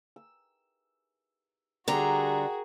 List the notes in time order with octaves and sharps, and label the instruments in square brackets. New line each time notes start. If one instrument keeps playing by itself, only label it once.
[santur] E6
[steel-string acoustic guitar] D3 G3 A#5 [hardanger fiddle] F#4 G#4 [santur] A#4 G5 C#6